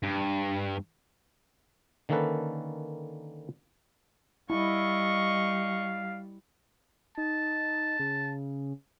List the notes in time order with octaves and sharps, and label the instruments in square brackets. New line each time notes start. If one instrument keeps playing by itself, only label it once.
[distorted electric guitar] G2
[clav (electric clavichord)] D3 D#3 A#3 C#4 A4 B4
[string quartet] G3 [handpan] E4 [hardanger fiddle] D#5 C#6 [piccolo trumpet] F5
[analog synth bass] D#4 [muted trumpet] A5
[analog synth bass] C#3